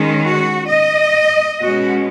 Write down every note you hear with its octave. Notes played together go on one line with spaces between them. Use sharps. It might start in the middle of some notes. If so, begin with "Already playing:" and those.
Already playing: D#3 G#3 C#4
F#4
D#5
B2 G#3 C#4 F#4